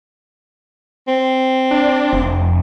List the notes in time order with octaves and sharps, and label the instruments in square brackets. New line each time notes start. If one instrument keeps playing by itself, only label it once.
[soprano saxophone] C4
[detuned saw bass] D4
F1